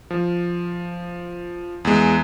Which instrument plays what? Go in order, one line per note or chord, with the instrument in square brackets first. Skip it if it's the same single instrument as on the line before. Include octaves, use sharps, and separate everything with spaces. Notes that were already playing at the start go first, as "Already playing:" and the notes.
[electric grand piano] F3
E2 G#3